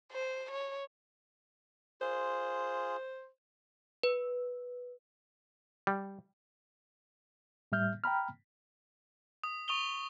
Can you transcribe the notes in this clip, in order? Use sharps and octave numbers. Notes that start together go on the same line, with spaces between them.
C5
C#5
F4 G#4 C5
B4
G3
A2 G3 E5 F6 G6
G5 A#5 B5 F6
D#6
C#6 D#6 F7 G7